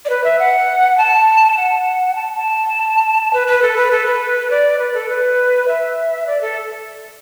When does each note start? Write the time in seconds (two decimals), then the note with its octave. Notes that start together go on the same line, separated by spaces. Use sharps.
0.05 D5
0.09 B4
0.24 E5
0.39 F#5
0.98 A5
1.57 F#5
2.15 A5
2.36 A5
3.33 B4
3.47 B4
3.62 A4
3.76 B4
3.91 A4
4.06 B4
4.50 D5
4.79 B4
4.94 A4
5.09 B4
5.68 E5
6.26 D5
6.41 A4